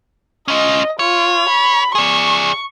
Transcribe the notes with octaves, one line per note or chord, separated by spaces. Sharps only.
C#4 F4 D#5
F4 C#5
B5
G#4 D5 C#6